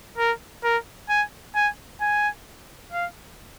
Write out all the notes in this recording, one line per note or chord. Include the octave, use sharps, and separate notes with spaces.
A#4
A#4
G#5
G#5
G#5
F5